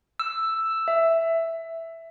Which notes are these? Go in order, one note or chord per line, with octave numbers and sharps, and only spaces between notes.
E6
E5